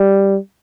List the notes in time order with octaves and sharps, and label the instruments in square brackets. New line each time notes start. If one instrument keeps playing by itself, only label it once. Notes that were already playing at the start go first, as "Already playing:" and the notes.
Already playing: [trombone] G3